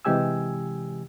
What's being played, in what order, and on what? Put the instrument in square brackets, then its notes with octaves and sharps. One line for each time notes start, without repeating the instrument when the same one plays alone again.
[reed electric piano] C3 E3 G#3 G4 G#5 E6